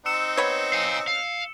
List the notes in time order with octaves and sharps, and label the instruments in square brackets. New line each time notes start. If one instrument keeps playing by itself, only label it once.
[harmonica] C4 D#4 [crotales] E6 C#7 E7
[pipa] B3 C#5
[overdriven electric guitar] F5 G#5
F5